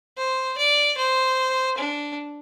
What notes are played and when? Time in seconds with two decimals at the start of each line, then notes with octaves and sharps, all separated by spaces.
0.17 C5
0.58 D5
0.97 C5
1.78 D4